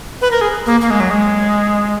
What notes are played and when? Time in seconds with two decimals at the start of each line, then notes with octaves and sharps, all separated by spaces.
0.21 B4
0.31 A#4
0.41 G#4
0.66 A#3
0.81 A#3
0.90 G#3
1.00 F#3
1.10 G#3